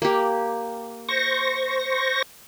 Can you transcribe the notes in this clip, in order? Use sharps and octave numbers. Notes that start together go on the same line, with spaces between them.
A#3 G4
C5 C#6 A#6